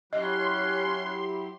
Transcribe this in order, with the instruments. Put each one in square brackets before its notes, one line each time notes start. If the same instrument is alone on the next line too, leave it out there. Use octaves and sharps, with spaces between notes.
[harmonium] F#3 E4 G4 [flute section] C#4 F#6 [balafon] D#5 [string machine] C6